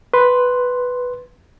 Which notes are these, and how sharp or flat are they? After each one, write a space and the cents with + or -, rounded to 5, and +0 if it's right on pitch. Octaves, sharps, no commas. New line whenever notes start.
B4 +0 C6 +0